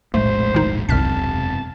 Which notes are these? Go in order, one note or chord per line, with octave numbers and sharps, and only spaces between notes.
E1 A#1 A2 G#3 A3 C5
D#3 D#4
E1 C2 F#2 C3 A5 F6 B6